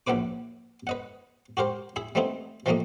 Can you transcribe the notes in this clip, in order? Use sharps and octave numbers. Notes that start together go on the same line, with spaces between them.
A#1 F#2 B3 E4 B4 D6
B4 D#5 F#5
F#4 G4 A#4 C5
E4 G#4 E5
G3 A3 B3 C4 D#4 E4
E3 F3 G3 A3 A#3 D#5